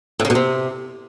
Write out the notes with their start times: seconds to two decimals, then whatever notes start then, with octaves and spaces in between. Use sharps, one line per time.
0.20 A2
0.25 C#3
0.30 B2
0.35 C3